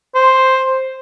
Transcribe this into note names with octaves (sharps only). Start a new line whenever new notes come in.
C5